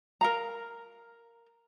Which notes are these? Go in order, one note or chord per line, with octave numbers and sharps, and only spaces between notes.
A#4 F5 A#5